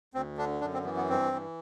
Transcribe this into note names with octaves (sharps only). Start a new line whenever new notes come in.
D2 C4
D3 D4
F#2 D4
C4
E3 B3
B3
G2 C4
E3